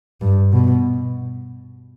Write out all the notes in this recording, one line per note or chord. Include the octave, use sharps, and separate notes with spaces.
G2
B2